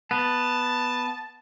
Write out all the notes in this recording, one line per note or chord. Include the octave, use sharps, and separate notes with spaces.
B3 A5